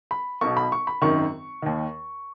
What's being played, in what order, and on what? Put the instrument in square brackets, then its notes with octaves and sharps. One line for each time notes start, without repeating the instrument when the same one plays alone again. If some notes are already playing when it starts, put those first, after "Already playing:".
[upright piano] B5
B1 B2 C#6
B5
C#6
B5
G#1 F#2 D#3 C#6
D#2 D#3